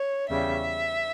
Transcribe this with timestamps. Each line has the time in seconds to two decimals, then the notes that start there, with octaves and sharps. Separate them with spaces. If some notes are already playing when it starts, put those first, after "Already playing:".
Already playing: C#5
0.30 E2 C#3 G3 E5